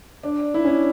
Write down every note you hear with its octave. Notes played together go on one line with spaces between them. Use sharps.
D4
E4
C#4
D4